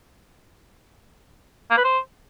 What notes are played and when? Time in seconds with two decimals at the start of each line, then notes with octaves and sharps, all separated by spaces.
1.70 A#3
1.77 B4
1.84 C5